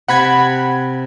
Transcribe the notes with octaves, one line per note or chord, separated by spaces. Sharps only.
C3 F#5 G5 B5 G#6